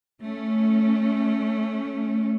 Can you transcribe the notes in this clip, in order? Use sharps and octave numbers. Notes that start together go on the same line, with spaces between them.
A3 C#4